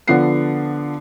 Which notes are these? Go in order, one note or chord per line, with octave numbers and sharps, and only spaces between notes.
D3 F3 B3 F#5 C7